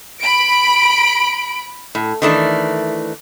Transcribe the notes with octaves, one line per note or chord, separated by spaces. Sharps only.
B5 D7
A2
D#3 E3 A3 D4